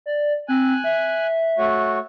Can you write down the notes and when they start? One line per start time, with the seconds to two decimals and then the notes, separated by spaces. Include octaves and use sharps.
0.06 D5
0.48 C4 G#5 F#6
0.84 E5
1.58 A3 F#4 C#5